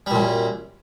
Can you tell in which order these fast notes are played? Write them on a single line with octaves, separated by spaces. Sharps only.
G3 A#2 F#2